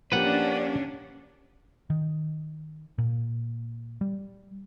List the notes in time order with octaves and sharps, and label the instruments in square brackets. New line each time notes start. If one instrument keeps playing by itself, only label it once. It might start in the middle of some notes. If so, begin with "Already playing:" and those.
[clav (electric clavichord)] F3 A#3 G4 [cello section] C#4 D4 [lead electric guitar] B4 F#5
[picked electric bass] D#3
A#2
G3